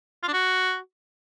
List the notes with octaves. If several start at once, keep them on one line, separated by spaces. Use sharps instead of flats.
F4
D4
F#4